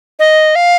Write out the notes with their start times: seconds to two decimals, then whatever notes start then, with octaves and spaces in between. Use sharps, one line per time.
0.19 D#5
0.55 F5